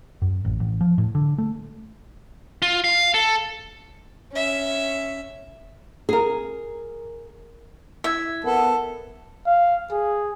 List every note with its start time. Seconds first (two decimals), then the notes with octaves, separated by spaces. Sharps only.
0.22 F#2
0.45 A1
0.60 A1
0.81 F3
0.98 A2
1.15 D3
1.38 A3
2.62 F4
2.84 F5
3.14 A4
4.32 C#4 E5
6.09 G#4 A#4
8.04 E4 E5 G#6
8.44 B3 A4 A#4
9.46 F5
9.91 G#4